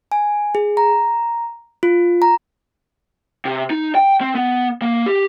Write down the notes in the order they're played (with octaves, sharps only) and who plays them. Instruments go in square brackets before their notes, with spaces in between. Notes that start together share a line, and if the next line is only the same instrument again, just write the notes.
[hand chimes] G#5
G#4
A#5
F4
A#5
[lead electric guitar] C3
D#4
G5
C4
B3
A#3
G4